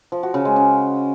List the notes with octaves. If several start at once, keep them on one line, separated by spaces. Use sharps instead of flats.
F3
F#4
C#3
G#3
C#4